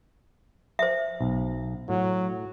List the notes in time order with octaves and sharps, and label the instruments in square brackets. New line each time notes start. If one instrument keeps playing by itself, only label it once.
[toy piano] C5 E5
[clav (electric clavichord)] B1
[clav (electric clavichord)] A2 [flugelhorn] F#3